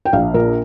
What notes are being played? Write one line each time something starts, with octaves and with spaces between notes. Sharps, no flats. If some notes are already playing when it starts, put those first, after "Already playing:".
G5
A#1 F5
A#2 A#4